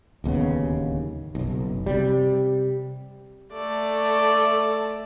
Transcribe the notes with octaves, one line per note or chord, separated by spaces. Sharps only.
D1 D#2 C#3 B3
F#1 B1
C3 G3
A3 D5